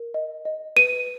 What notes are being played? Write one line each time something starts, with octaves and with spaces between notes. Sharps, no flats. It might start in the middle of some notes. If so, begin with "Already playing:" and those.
Already playing: A#4
D#5
D#5
B4 D#7